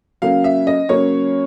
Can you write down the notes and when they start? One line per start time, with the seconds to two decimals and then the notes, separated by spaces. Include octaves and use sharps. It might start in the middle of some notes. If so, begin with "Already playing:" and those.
0.22 C#3 F#3 A#3 F5
0.44 E5
0.67 D#5
0.89 C#3 F#3 A#3 C#5